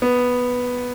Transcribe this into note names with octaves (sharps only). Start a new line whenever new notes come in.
B3